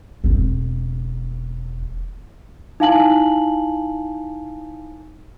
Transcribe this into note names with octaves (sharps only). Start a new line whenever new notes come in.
E1 C4
D#4 E4 F5 G#5 A5 F#7